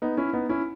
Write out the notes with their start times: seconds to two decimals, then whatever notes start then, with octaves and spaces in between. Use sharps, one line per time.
0.02 B3 D#4
0.17 C#4 E4
0.33 B3 D#4
0.49 C#4 E4